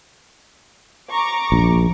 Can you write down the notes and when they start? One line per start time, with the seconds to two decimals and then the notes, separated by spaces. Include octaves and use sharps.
1.10 A#5 C#6 D6
1.52 A#1